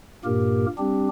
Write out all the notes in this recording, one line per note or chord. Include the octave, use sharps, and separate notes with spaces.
G2 A#2 A#3 G4 A#4
G3 C4 D4 G4